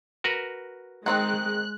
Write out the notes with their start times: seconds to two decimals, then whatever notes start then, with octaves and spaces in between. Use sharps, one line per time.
0.24 F#4 A#4 B4
1.06 D#3 G#3 C4 D#4 F#6